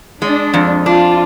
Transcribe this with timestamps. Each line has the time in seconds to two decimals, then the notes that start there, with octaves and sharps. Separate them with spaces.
0.22 G#3 D4
0.54 F2
0.86 D4 F4